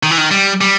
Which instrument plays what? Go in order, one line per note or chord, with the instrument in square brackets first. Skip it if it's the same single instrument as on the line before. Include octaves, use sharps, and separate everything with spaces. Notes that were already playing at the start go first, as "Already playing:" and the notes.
[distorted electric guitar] D#3
E3
D#3
G3
G3